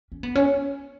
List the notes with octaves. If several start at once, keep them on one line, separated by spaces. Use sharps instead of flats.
C#4
B3
C#4